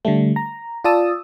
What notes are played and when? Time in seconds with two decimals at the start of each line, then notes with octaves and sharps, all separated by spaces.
0.05 D3 G3 A3
0.36 A#5
0.84 F4 D5 A5 D#6 E6